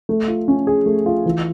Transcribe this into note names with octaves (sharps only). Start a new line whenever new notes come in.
A3
F4
C#4
G#4
A3
F4
E3